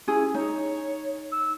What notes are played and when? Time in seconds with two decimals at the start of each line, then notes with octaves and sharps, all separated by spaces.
0.07 C#4 E4 G#4
0.34 D#4 C#5
1.32 E6